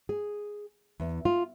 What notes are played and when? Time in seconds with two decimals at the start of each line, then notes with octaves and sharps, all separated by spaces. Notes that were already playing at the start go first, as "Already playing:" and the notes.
0.09 G#4
1.00 E2
1.25 F4